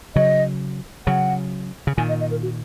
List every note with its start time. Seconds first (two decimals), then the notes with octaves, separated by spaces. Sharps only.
0.16 C#3 F#3 D#5
1.06 C#3 F#3 F#5
1.87 C#3
1.97 A#2 D#3 G#5
2.09 D#5
2.21 D#5
2.31 A#4
2.43 F#4